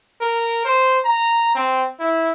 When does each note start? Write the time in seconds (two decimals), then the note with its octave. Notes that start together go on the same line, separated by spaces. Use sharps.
0.21 A#4
0.65 C5
1.05 A#5
1.55 C4
2.00 E4